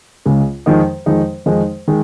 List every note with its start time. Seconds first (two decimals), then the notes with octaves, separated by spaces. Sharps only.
0.26 C#2 C#3 G#3
0.66 F2 D#3 G#3 D#4
1.06 F2 D#3 G#3 D#4
1.46 F2 D#3 G#3 D#4
1.88 D#3 G#3